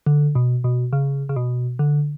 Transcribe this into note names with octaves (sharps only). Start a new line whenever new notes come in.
D3
B2
B2
C#3
C#3
B2
D3